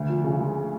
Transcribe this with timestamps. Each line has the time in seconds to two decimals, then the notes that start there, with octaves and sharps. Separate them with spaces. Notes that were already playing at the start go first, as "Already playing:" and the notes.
Already playing: D2
0.09 F3
0.24 C#3
0.40 G#3